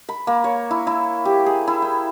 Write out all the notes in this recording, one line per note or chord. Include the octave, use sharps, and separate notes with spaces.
B5
A#3
C#5
E4
E4
G4
G#4
E4
G5